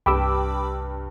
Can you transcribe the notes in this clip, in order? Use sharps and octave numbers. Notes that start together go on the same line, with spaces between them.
C2 G2 G5 B5 D6 E6